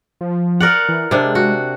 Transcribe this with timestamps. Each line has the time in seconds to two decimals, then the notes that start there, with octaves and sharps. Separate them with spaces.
0.21 F3
0.60 A#4 D5 F#5
0.89 E3
1.11 C3 G#3 D4
1.35 F#4